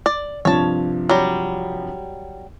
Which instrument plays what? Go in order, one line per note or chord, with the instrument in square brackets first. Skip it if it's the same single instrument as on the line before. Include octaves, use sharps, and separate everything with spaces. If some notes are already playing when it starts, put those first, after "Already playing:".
[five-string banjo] D5
[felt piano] G2 C3 F3 [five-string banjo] C#5 A5
[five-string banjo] F#3 G3